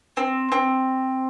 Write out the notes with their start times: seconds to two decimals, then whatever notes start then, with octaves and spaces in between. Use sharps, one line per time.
0.17 C4
0.52 C4